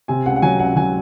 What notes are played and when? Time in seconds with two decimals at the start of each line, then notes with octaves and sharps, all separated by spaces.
0.08 C3 G#5
0.26 C#2 F#5
0.36 F#5
0.42 F#3 G#5
0.59 C#2 F#5
0.76 F#3 G#5